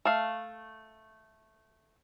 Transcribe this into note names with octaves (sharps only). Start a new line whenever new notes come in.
A3 F5